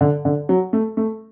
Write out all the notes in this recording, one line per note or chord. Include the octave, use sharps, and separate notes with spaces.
D3
D3
F#3
A3
A3